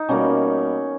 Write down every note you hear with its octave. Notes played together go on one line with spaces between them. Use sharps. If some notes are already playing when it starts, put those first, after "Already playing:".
Already playing: D#4
B2 G3 A#3 C#4